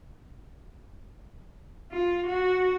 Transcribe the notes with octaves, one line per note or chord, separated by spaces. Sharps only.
F4
F#4